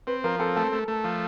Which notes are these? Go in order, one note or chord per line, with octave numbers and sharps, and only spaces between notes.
C4 B4
F3 A#4
C4 A4
A3 A4
A3
A3
F3